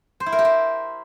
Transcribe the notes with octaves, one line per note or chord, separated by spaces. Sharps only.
C5
E4
A#4
G4
C5